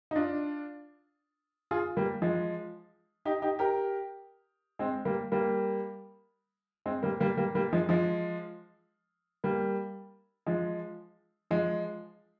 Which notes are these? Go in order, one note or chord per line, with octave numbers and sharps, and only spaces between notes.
D#4
D4 F4
F4 G#4
G3 A#3
F3 G#3
D#4 G4
D#4 G4
G4 A#4
G#3 C4
G3 A#3
G3 A#3
G#3 C4
G3 A#3
G3 A#3
G3 A#3
G3 A#3
F3 G#3
F3 G#3
G3 A#3
F3 G#3
F3 G#3